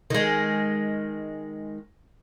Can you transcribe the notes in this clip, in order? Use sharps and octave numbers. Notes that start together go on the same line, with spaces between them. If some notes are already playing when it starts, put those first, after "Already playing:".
D#3 G#3